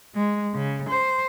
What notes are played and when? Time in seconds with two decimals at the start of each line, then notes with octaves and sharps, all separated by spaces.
0.15 G#3
0.54 C#3
0.89 C5